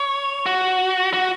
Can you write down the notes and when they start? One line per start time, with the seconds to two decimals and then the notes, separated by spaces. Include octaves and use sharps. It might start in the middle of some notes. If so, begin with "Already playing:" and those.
Already playing: C#5
0.46 F#4
1.13 F#4